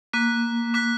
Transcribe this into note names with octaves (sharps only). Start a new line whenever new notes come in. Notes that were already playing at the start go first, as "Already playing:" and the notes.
A#3 D6 F#6 B6
D6 F#6 B6